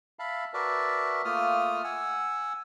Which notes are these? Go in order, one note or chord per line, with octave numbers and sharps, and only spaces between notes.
E5 F5 A5 B5
F#4 A#4 B4 D5 E5 A5
A3 A#3 F4 D#6 F6
F#5 G#5 E6